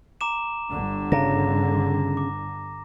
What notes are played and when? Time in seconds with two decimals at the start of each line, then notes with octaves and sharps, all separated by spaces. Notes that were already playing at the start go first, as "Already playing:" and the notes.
0.21 A#5 D6 E7
0.70 G1 D3
1.12 C#3 A#5 A#6
2.17 D6